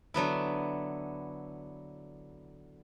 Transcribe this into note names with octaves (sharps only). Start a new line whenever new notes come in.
D3 F#3 B3 E4